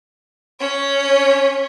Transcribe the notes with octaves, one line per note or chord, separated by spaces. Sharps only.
C#4 C#5